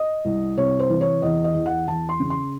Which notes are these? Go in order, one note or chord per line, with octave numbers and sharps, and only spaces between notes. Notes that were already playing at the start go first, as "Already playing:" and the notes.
Already playing: D#5
C2
C3 C#5
C5
E3
C#5
E2 D#5
D#5
E2
F#5
E2 A5
C6
C#3
C6